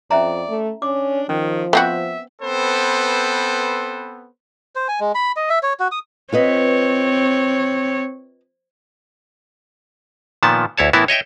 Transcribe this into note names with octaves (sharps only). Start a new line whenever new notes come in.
F2 C#4 D5 E5 A#5
A3
C#4 D4 D6
D#3 F3 C#4
B3 C4 F#4 E5
B3 C4 A4 B4 C5
C5
G#5
G#3
B5
D#5
E5
C#5
F#4
D#6
C4 F4 B4 C#5 D#5
A#2 D#3 F3 B3 A5
D2 E4 C#5 A5
A2 E3 B3 E4 A#4 A5
C#5 D#5 E5 G5